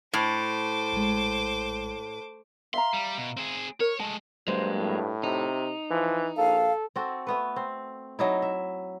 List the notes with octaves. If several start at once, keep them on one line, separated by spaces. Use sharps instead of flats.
A2 C5 D6
A#1 G#3
E5 F5 A#5 C6
G3
B2
C4 G#4
A#4 C#5
G#3 A3 A5
G2 F#3 G#3 A#3 C5
A2
C3 D#4
E3 F3
A#1 A4 F5
C4 F#4 A4
A3 B3 B4
C4
F#3 D#4 E4
E5